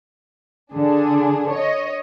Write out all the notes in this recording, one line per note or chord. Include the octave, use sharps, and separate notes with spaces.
D3 D4 G#4
C#5 D#5